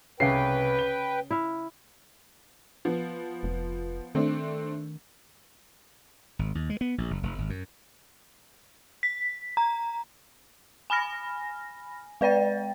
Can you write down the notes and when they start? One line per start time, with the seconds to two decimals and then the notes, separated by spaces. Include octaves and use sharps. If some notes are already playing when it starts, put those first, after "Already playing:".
0.20 C2 C#3 B4 G5 C7
0.79 G7
1.31 E4 E5 F5
2.85 F3 B3
3.43 F1
4.15 D#3 A3 C4 D4
6.39 G#1
6.55 D#2
6.70 G#3
6.81 B3
6.98 A#1
7.11 F#1
7.23 F1
7.38 G#1
7.50 F#2
9.03 B6
9.57 A#5
10.90 G#5 B5 F6 A#6
12.21 G#3 B4 D5 G5 A6